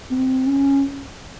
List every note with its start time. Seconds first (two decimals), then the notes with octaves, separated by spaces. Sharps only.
0.11 C4
0.47 C#4